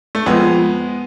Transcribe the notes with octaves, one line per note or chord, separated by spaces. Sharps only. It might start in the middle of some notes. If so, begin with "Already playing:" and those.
A3
F2 F3 G#3 B3